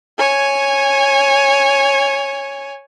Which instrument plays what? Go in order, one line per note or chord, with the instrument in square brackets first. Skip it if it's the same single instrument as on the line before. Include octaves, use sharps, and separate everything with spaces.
[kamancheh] C#5 G#5